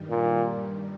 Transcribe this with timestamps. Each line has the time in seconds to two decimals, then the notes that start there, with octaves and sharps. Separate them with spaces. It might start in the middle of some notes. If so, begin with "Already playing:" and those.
Already playing: G2 D#3 G3
0.10 A#2